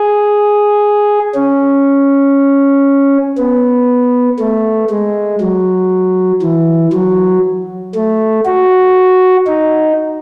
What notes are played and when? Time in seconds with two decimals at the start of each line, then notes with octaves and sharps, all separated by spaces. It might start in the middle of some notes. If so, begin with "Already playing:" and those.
Already playing: G#4
1.35 C#4
3.38 B3
4.39 A3
4.90 G#3
5.41 F#3
6.43 E3
6.93 F#3
7.95 A3
8.46 F#4
9.47 D#4